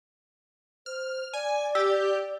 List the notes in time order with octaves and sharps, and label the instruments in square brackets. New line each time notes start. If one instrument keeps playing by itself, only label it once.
[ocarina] C5 [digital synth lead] F6
[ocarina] D5 [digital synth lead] G#5
[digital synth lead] G4 [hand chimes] E6